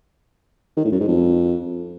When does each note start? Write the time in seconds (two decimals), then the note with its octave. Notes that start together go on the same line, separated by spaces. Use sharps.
0.77 D#3
0.85 A2
0.93 F#2
1.00 G#2
1.08 F2